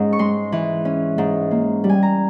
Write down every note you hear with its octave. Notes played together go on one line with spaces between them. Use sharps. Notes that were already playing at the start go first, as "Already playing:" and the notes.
Already playing: G#2 C#4
C#6
G#3 C6
E3
C#4
G#2
A#3
G3
G#5
A#5